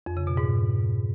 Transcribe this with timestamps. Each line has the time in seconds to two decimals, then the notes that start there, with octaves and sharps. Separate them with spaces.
0.06 F2
0.17 C#3
0.27 B2
0.37 G#2